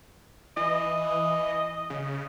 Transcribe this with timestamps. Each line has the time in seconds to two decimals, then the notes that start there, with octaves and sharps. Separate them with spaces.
0.57 E3 D#5
1.90 C#3